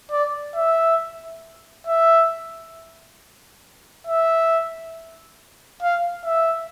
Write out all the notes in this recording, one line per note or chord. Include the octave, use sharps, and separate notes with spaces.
D5
E5
E5
E5
F5
E5